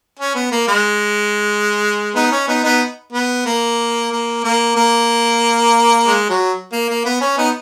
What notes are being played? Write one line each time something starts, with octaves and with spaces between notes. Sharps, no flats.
C#4
B3
A#3
G#3
B3 D#4
C#4
B3 D#4
B3 D#4
B3
A#3
A#3
A#3
A#3
G#3
F#3
A#3
A#3
B3
C#4
B3 D#4